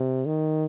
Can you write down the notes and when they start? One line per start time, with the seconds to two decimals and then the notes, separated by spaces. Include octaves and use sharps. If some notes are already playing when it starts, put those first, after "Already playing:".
Already playing: C3
0.26 D#3